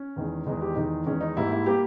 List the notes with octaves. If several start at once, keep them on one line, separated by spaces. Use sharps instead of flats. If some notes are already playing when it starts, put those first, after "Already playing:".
Already playing: C#4
E2 D#3 G#3
E2 D#3 G#3 D#4
G4
E2 D#3 G#3 D#4
E2 D#3 G#3 C#4
D#4
G#2 G3 A#3 E4
E4
G3 A#3 G4